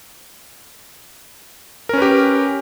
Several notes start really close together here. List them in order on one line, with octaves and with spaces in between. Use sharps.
A#4 C#4 B4 G4